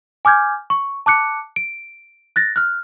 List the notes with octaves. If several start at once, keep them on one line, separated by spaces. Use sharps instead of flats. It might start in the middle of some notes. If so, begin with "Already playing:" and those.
G#5 D6 F6 G6 G#6
C#6
A5 D6 F#6 C#7
D7
F#6 A6 A#6
F6 F#6